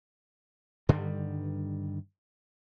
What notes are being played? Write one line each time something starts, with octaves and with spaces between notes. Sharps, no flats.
G2 D3 D#3 G3